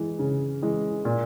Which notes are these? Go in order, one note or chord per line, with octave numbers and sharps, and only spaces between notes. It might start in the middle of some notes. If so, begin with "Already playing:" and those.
Already playing: E3 G#3
C#3
E3 G#3
A#2